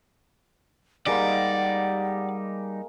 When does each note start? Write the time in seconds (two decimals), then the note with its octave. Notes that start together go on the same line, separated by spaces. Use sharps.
1.06 G3 G#3 A#3 D#4 G4 D5 F#5 B5